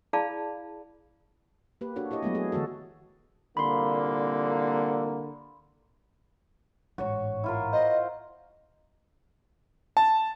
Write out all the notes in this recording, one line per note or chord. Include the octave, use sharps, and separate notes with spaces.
E4 G#4 D5 F5 A5 B5
A#3 G4 B4
D4 F#4 A4 C#5
E4 G4 C#5 D#5
F#3 G#3 A3 B3
G#4
D3 E3 A3 F#4 A4
C2 A#2 D3 A#3 B5 C6
A1 G#2 F#4 C#5
E4 F4 A#4
C5 D#5
A5